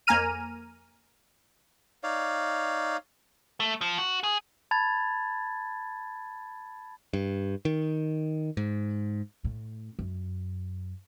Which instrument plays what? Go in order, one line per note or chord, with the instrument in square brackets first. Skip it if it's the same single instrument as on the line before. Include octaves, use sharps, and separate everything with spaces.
[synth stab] F2 A#3 G#5 A#5 F6 D#7
[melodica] D#4 C#5 D5 F5
[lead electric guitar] A3
F3
F#4
G#4
[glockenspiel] A5 B5 G#6 A6
[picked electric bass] G2
D#3
G#2
[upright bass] A2
F#2